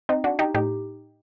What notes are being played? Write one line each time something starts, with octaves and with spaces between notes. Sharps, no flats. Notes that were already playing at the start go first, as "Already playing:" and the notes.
C4 D#4
D4 F#4
D#4 G4
A2 D#4 G4